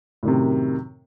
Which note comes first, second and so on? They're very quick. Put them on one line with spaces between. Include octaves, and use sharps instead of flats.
A2 D#3 C3 F#2